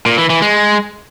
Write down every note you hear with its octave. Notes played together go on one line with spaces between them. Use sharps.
A#2
E3
E3
G#3